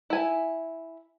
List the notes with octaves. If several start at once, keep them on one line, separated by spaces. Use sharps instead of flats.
E4 G#5